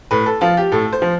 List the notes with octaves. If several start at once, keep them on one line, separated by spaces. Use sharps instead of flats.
A2 B4
A4
F3 F4
G4
A2 A4
C5
F3